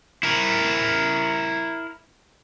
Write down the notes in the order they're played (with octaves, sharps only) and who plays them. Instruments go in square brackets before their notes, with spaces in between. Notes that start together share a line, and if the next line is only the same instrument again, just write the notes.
[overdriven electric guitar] E4 A#4